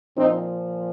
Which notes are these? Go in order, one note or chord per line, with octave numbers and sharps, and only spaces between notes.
A#2 F3 C4 D#4